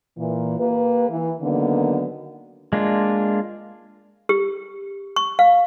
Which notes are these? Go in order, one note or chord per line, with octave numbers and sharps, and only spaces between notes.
A#2 E3
A#3 G4 B4
E3
D3 D#3 F#3 A#3 B3
G#3 A#3 D4 F4
G4
C#6
F5